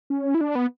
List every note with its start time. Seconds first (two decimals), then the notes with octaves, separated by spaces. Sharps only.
0.10 C#4
0.35 E4
0.41 D4
0.55 B3